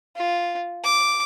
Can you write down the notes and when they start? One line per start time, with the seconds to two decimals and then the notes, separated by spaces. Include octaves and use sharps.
0.16 F4
0.84 D6